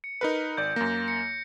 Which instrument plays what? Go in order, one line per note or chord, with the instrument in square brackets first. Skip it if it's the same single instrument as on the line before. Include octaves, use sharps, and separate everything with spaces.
[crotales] C#7
[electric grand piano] D#4 A#4 B4
[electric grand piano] G#1 D5 [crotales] G6
[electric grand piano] F#2 A#3 [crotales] A#6
[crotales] C#7